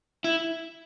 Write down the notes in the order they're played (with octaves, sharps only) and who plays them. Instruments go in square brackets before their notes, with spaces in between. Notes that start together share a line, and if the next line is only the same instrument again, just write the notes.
[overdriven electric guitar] E4